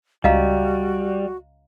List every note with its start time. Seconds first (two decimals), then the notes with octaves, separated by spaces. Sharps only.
0.24 C#2 G3 F#4 D#5 F5 A#5